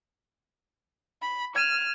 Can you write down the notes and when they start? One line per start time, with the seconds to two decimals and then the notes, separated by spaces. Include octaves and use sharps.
1.22 B5
1.56 F6 G#6 D#7 E7